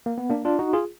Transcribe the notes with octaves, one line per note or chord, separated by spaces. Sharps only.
A#3
B3
A#3 D4
D4 F4
D#4 F#4
F4 G#4